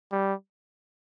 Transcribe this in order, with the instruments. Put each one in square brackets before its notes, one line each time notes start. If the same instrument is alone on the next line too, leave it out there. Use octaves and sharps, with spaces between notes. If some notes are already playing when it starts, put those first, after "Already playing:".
[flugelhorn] G3